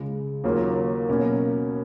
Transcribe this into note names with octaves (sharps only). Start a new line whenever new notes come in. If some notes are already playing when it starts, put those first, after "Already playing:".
Already playing: C#2 C#3 G#3
D#2 C#3 F#3 A#3 F4
B2 F#3 A#3 C#4